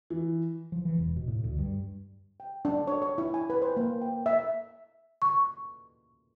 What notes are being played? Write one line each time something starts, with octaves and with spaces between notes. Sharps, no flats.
E3
F3
E3
E1
B2
A2
D2
G2
G5
D4
C#5
C#5
E4
G#5
B4
C5
A#3
G5
E5
C#6